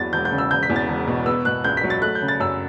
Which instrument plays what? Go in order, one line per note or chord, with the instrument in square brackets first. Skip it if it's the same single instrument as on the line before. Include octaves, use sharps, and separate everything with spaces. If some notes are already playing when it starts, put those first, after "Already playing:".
Already playing: [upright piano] E2 F#3 A6
E1 G6
G6
C#3
E6
E1 G6
B6
E2
A6
E1
B2
B3 E6
B2 F#6
C#2 G6
B6
F#3
A6
A3 F#6
G6
C#3
A6
F#2 E6